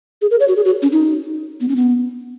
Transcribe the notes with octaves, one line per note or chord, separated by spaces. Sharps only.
G#4
A#4
C#5
F#4
G#4
F#4
C#4
D#4
B3
C#4
B3